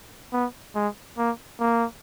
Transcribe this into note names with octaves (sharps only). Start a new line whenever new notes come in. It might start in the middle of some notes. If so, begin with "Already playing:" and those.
B3
G#3
A#3
A#3